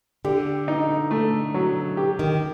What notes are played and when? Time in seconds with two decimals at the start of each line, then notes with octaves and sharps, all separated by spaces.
0.25 D3 G4
0.68 D#4
1.11 A3
1.54 F#3
1.97 G4
2.19 D#3